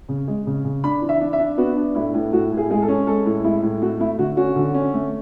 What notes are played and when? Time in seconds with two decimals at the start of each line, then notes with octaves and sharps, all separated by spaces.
0.09 C#3
0.28 G#3
0.47 C#3
0.65 C#3
0.84 D4 B5
1.02 E3
1.09 E5
1.21 D4
1.33 E5
1.39 D4
1.58 B3 F#4
1.77 D4
1.95 A2 E4
2.14 A2
2.32 A2 F#4
2.52 A2
2.57 G#4
2.70 G#3 G#4
2.82 A4
2.88 C#4
3.07 G#3 A4
3.26 A2
3.44 G#3 E4
3.63 A2
3.82 A3 F#4
4.00 A3 E4
4.19 D3 F#4
4.37 C#4 F#4
4.56 D3
4.75 C#4
4.93 A3